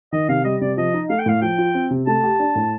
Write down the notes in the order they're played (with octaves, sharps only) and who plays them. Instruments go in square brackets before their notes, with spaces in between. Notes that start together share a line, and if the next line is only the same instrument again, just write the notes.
[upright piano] D#3 [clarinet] D#5
[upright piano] C3 [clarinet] F5
[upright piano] G3 [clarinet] D#5
[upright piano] C3 [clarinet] D5
[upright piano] F3 [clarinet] D#5
[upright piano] D#4
[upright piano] A3 [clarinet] F5
[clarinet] G5
[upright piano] A2 [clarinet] F5
[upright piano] F3 [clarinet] G5
[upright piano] F4
C4
C3
[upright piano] A3 [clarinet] A5
[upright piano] G4
D4
A2